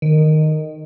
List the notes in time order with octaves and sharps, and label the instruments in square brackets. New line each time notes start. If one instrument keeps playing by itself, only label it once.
[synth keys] D#3